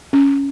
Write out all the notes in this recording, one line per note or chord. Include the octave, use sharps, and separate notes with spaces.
C#4